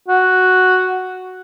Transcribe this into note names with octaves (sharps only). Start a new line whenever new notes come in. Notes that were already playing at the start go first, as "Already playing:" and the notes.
F#4